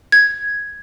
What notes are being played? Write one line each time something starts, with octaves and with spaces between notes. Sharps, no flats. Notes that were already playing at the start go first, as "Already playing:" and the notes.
G#6